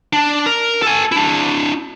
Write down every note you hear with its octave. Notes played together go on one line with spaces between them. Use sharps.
D4
A#4
A4 G#5
D4 E4